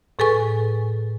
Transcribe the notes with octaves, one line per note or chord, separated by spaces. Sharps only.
A2 G#4 A4 B4 G#5 C#6